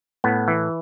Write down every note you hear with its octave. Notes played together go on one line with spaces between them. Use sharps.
A2 B3
E3